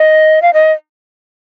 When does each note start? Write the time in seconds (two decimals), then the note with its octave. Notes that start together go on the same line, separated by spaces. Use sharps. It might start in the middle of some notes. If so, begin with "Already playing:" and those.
Already playing: D#5
0.42 F5
0.53 D#5